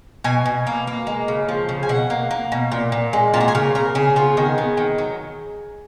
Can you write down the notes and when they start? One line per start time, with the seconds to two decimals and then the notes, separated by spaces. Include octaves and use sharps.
0.24 B2 G#5
0.46 B2
0.67 A#3
0.87 A#3
1.07 G#3
1.28 C#3
1.49 F3
1.69 C#3
1.83 G#5
1.89 B2 F#5
2.10 A#3
2.31 A#3
2.52 B2
2.72 A#2
2.92 A#2
3.13 G#3
3.34 A#2 F4
3.40 F#4
3.48 G#4
3.55 C#3 A#4
3.75 C#3 A#4
3.95 C#3 G#4
4.16 B3 F4
4.37 D#3 G#4
4.58 B3
4.77 D#3
4.98 F#3